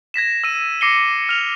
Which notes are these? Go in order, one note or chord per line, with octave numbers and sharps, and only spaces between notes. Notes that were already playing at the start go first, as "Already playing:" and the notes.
G#6 A#6 B6 E7
E6 D#7
D6 A#6 C7 C#7 D#7 G7
F6 F7